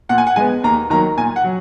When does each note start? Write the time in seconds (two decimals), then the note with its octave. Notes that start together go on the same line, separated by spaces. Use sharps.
0.09 A#2 F#5
0.18 G#5
0.27 F#5
0.36 G#3 B3 G#5
0.64 D#2 A#5
0.90 D#3 F#3 A#3 A#5
1.17 A#2 G#5
1.36 F#5
1.44 F#3